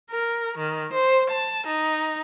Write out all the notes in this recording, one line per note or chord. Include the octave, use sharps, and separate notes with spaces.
A#4
D#3
C5
A5
D#4